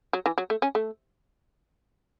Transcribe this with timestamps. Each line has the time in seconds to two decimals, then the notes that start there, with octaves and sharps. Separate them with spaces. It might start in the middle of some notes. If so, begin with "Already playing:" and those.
0.13 F#3
0.26 E3
0.38 F#3
0.50 A3
0.62 C#4
0.75 A3